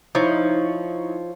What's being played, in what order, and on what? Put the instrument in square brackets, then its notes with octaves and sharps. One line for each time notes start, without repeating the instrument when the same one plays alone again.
[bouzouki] F3 [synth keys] D#4 E4 C#5